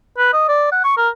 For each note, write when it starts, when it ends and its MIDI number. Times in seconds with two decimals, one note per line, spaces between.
0.18 0.32 71
0.33 0.47 75
0.48 0.68 74
0.72 0.80 78
0.84 0.96 85
0.97 1.09 70